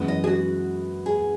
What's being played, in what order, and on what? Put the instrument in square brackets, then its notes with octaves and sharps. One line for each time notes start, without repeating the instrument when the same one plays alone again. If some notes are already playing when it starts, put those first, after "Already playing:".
Already playing: [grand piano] F#2 E3 G#3 B3
[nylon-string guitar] D#5
G#4
F#4
G#4